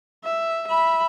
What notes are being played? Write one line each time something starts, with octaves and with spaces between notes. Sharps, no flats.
E5
E5 B5